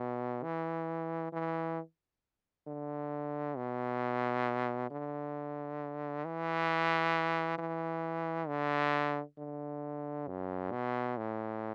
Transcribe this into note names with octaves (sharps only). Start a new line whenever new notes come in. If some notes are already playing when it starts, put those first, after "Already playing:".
Already playing: B2
E3
E3
D3
B2
D3
E3
E3
D3
D3
F#2
B2
A2